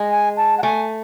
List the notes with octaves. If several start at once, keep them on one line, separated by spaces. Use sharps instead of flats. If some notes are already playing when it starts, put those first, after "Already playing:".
Already playing: G#3
G#5
A5
F#5
A3 G#5